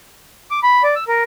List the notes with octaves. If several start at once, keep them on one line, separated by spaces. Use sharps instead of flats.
D6
B5
D5
E6
A#4